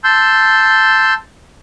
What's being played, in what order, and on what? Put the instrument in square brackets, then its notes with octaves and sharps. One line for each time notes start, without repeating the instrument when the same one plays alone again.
[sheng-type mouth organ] A5 C6 E6 G6